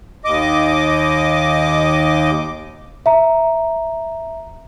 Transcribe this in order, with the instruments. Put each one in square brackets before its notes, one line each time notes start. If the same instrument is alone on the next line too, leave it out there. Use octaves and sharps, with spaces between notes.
[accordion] D#2 D#5 D6
[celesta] E5 A#5